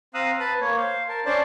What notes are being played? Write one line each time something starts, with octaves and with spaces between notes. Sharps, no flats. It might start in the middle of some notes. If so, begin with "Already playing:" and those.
C4 F5 A#5 D#6 E6 F#6
B4 A5 B5
A#3 C#5
C5 F5
A#4 A5
C#4 D4 C5 D5 A5